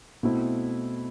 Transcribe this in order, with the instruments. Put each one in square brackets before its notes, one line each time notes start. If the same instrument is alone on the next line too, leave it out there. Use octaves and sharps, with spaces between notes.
[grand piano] B2 A3 C4 E4